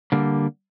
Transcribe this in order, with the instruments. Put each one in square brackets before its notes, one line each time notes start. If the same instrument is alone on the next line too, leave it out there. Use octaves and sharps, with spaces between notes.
[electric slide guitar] D3 G3 A#3